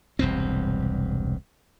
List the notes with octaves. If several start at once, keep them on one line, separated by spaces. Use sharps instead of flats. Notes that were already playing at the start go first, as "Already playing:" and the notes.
E1 C2 G2 C4